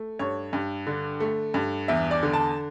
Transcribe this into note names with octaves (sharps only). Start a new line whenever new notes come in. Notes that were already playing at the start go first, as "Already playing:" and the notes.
Already playing: A3
G2 C#5
G2
D3
A3
G2
E2 E5
D5
D3
A5